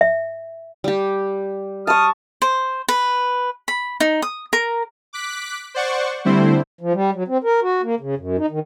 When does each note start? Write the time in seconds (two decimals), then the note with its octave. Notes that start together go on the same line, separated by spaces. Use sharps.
0.01 E5
0.84 G3 G4
1.87 A5 C#6 D#6 F6
2.42 C5
2.88 B4
3.68 B5
4.00 D#4
4.22 D#6
4.53 A#4
5.13 D6 F#6 B6
5.74 C5 D5 F#5 C#6
6.25 D3 G3 A3 C4 E4 C5
6.81 F3
6.93 G3
7.15 F#3
7.28 C4
7.44 A#4
7.62 F#4
7.83 A#3
8.00 C#3
8.17 F#2
8.38 D#4
8.50 D#3